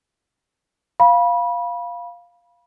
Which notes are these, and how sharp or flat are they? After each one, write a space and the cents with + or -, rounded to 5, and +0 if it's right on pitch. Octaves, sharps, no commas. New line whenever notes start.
F5 +0 B5 -25